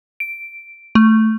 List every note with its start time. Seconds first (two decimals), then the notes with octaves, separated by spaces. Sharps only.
0.20 D7
0.95 A3